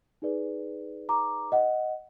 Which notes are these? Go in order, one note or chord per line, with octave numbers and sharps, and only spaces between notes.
D#4 G#4 B4 D5
A#5 D6
D#5 F#5